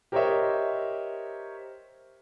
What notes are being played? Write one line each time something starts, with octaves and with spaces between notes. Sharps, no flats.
G4 A#4 C5 C#5 D#5 E5